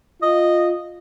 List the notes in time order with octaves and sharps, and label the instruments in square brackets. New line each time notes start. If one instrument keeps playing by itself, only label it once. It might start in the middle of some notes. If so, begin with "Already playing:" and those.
[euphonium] F4 [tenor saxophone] D#5